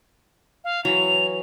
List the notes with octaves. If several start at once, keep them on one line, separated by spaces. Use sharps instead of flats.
F5
E3 F#3 F7